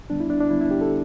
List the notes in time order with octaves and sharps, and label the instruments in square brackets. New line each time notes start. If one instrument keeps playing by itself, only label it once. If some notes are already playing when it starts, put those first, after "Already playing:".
[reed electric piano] D3 G3 B3 D4
E4
D4
D4
D3 G3 B3 E4
E4
G4
A4